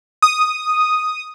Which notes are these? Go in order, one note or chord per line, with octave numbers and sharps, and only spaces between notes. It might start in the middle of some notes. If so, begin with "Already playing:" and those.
D#6